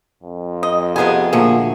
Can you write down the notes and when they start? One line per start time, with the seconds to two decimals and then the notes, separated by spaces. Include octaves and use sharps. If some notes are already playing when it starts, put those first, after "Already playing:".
0.23 F2
0.63 D#5
0.96 C3 B3 G4 G#4 G#5
1.33 D2 A#2 F3 F#3 G#4